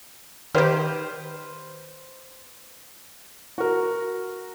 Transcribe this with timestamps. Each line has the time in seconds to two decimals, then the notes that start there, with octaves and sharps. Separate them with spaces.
0.55 D#3 G4 B4 C5 F6
3.58 F#4 A#4